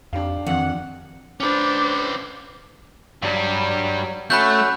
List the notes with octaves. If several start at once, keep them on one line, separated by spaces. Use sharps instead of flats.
F2 D4 G4 F5
F2 D#3 F#5
C#4 D4 B4 C5 D6
G2 F#3 G3
A3 C#4 F#4 B5 E6 F#6 G6